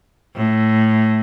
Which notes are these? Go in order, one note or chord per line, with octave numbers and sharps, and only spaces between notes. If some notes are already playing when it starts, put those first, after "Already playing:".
A2